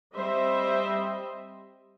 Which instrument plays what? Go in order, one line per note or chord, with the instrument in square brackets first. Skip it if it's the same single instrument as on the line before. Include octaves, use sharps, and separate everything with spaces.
[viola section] G3 C4 C5 D#5 E5